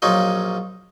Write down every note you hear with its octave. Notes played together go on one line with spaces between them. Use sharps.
A#1 F#3 C#4 D#4 F4 D#5